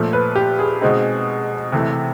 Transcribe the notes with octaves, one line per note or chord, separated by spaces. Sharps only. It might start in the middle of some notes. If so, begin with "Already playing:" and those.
Already playing: A#2 F3 A3
B4
G4
G#4
B2 G#3 C4 D#4
C3 E3 A3